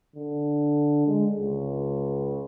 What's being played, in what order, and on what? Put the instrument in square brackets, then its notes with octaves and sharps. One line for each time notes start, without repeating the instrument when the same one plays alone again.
[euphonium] D3
G#3
C#2